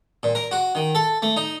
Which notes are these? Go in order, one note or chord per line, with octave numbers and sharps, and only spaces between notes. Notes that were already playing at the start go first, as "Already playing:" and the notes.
A#2
A#4
F#4
D#3
A4
A3
D#4